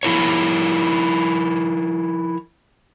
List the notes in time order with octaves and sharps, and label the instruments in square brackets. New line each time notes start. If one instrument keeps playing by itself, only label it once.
[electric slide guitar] F3 E4 A#4 C#5